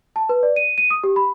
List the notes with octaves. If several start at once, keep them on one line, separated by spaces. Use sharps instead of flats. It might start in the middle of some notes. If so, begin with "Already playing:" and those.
A5
B4
D5
D#7
D#7
D#6
G4
B5